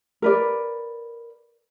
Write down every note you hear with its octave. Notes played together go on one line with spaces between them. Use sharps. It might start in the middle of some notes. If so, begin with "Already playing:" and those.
A#4 B4 D5